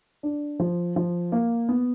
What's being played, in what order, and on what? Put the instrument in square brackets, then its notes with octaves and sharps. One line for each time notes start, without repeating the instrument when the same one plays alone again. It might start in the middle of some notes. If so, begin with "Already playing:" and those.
[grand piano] D4
F3
F3
A#3
B3